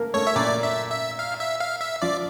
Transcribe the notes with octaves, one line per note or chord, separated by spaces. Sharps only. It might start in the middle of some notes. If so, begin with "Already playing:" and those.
Already playing: A3 A#3 A4 A#4
A3 A4 C#5
E5
A#2 A#3 D5
E5
E5
F5
E5
F5
E5
F3 F4 D5